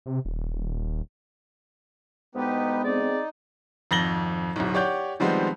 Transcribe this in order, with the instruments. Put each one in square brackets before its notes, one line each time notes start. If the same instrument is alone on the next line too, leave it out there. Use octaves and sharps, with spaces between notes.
[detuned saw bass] C3
D#1
[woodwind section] D2 G#3 B3 [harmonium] D#4 G4 B4
[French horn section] C4 G#4 [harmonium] D#4 [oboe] D5
[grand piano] G#1 F2 A6 A#6 F#7 G7
D1 B1
G4 C#5 D5 F#5 G6
D#3 F3 G3 G#3 B3 C4